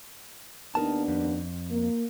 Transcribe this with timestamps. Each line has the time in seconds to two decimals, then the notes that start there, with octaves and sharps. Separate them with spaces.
0.75 D#2 B3 D4 D#4 A#4 A5
1.08 F2
1.71 A#3